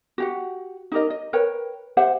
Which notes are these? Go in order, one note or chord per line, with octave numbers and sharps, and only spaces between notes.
F#4 G4 F#5
D#4 G4 A#4 D#5
D#5
A#4 B4 C#5 G5
G4 C5 E5 F#5